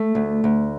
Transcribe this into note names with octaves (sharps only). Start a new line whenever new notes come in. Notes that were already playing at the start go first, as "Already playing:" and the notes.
Already playing: A3
D2
D2